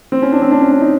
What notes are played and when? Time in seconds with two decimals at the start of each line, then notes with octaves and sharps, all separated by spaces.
0.12 C4
0.22 C#4
0.32 D4
0.42 C4
0.51 D4
0.61 C#4
0.71 D4
0.81 D#4